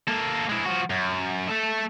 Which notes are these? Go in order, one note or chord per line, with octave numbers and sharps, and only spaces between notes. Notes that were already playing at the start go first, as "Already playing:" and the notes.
A#3 A4
G#3 E4
F3 F#4
F#2
A3 A4